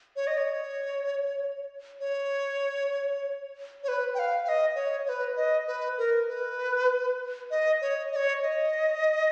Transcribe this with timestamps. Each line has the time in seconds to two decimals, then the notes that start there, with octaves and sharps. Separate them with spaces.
0.16 C#5
0.27 D#5
0.38 C#5
2.00 C#5
3.83 C#5
3.88 B4
4.14 G5
4.19 F5
4.44 F5
4.49 D#5
4.75 C#5
5.06 C#5
5.09 B4
5.37 D#5
5.67 B4
5.98 A#4
6.28 B4
7.51 D#5
7.81 C#5
8.12 D#5
8.16 C#5
8.43 D#5